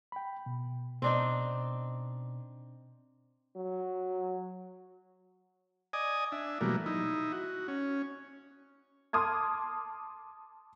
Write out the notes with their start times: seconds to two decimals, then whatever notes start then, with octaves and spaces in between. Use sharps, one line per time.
0.12 G5 B5
0.46 B2
1.02 B2 C4 D4 D#4
3.56 F#3
5.93 D5 D#5 G#5 D#6
6.32 D4 E5
6.61 B2 E3 F#3 G3 A3 A#3
6.86 D#4 E4
7.32 F#4
7.68 C#4
9.13 A5 C6 D6 D#6 F6 G#6